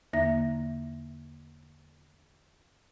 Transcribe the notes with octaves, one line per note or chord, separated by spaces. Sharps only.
E2 D3 A#3 D#4 E5 A#6